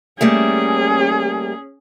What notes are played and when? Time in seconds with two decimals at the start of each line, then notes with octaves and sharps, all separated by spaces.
0.21 G3 A3 A#3 C#4 G#4